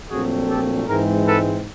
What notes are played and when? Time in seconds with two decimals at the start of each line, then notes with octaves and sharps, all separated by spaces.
0.09 A#1 A#2 F#3 A3 C4 F#4 G#4
0.48 G4 A4
0.87 G#2 E3 G#3 C4 G#4 A#4
1.26 A4 B4